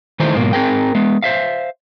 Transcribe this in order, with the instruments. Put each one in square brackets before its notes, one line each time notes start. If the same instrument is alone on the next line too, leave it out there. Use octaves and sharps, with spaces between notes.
[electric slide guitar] D#3 E3 A3 D#4 C5
G#2 B2 F#3 A#3
C4 G#4 A#4 G5
G#3 B3
C5 E5 F5